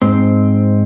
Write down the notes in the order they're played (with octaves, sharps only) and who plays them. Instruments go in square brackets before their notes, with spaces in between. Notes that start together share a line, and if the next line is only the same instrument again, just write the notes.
[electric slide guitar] G#2 C4